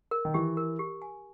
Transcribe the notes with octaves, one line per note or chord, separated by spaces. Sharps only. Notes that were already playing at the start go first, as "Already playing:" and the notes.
A#4
D#3
E3 G4
A#4
G4
G#5